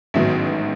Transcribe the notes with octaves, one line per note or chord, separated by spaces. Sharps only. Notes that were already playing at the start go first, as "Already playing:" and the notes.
A1 G#2 D#3 F#3 B3 E5